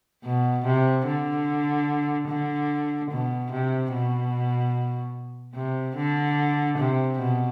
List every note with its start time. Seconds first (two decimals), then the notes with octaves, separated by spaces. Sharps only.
0.24 B2
0.65 C3
1.07 D3
2.28 D3
3.11 B2
3.52 C3
3.93 B2
5.55 C3
5.96 D3
6.78 C3
7.19 B2